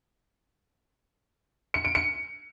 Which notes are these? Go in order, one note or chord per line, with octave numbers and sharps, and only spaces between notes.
C#7
D7
C#7